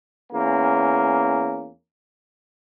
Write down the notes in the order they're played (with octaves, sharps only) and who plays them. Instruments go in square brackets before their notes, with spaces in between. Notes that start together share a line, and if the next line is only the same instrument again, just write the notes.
[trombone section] E2 A#3 C#4